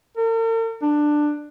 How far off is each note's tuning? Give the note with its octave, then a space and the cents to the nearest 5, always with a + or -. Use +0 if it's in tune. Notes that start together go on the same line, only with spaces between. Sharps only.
A#4 -45
D4 +15